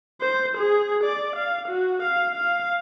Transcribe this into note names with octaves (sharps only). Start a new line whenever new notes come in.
C5
G#4
D5
F5
F#4
F5
F5